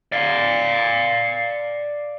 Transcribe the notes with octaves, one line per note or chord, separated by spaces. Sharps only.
D5 F5